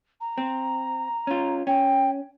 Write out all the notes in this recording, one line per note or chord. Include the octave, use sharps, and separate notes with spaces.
A#5
C4
C#4 F4
C#4 G5